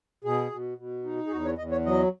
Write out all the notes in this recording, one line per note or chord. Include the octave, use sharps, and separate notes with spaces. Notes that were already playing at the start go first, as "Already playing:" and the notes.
B2 G#4
B2
B2
D#4
G#4
E2 F#4
C#5
E2 D#5
C#5
F#3 D#5